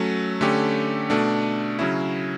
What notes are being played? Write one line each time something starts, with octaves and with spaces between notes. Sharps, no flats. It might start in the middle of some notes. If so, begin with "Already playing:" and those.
Already playing: F#3 A3 C#4
D3 A3 C#4 G4
B2 A3 D4
C#3 F#3 C#4 E4